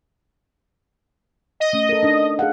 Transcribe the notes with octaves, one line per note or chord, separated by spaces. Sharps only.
D#5
A3 C#4
A4 A#4
D4 D#4
G#4 F5 F#5